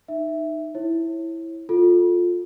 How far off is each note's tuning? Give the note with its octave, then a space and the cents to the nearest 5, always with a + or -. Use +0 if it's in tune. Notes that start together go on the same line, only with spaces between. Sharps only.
D#4 -15 E5 +0
E4 +0 C#5 -35
F4 +15 A4 +0